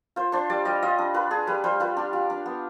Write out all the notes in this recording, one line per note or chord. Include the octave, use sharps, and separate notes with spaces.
F4 C5
D4 C5
G3 D5
G3 D#5
F4 D#5
D4
F4 B4
D4 G#4
G3 B4
G3 C5
F4 B4
D4 G4
F4
D4
B3